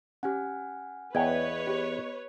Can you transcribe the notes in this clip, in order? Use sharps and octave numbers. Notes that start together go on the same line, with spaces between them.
C#4 G4 F#5 G#5 F6
E2 B3 B4 C#5 D#5 G5 G#6
G4